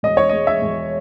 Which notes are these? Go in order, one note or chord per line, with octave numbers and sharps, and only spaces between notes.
E1 D#5
C#5
G#3 D#5
E5
E1